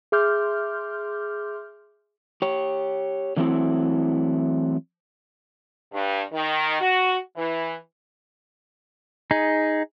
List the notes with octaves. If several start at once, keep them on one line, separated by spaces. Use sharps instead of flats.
G#4 E5 C6 D6 F6 G6
G4 C#5
D3 E3 F#3 A3 C4 E4
G2
D#3
F#4
E3
D#4 G#4